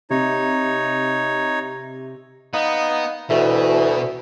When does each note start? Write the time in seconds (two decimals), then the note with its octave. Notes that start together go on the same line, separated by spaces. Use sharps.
0.10 C3 D#4 C#5
2.53 B3 D#4 F5
3.30 D2 B2 E3 F#4 E5